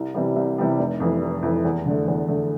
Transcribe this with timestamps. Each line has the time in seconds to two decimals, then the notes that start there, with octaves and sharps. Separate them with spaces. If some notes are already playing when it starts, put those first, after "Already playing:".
Already playing: C2
0.14 C3 E3 G3
0.36 C2
0.58 C3 E3 G3
0.79 F1
1.00 F2 E3
1.22 F1
1.43 F2 E3
1.65 E2
1.86 D3
1.91 A3
2.08 E2
2.28 D3 A3